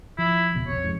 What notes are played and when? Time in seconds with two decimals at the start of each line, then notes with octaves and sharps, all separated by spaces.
0.18 F3 E4
0.55 D#1 C#2 B2
0.67 E1 A#1 C3 C#5
0.84 F2 G#2